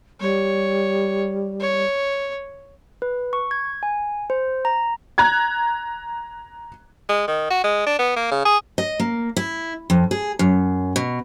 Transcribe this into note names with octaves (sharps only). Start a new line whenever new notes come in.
G3 C#5
C#5
B4
C#6
G#6
G#5
C5
A#5
A#5 F#6 G#6
G#3
D#3
F#4
G#3
D4
B3
A#3
C#3
G#4
D#5
A#3
E4
F2
G#4
F#2
B2